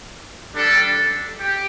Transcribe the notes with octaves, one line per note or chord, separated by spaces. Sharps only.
G3 D4 A4 D5
G4